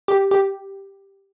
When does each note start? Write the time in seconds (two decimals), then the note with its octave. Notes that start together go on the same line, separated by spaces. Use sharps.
0.08 G4
0.31 G4